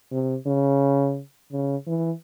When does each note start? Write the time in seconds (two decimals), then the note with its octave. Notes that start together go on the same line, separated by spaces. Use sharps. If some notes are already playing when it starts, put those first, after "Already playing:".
0.11 C3
0.46 C#3
1.52 C#3
1.87 E3